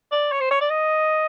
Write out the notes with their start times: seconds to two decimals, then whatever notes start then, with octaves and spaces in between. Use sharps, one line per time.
0.12 D5
0.32 C#5
0.40 C5
0.51 C#5
0.61 D5
0.70 D#5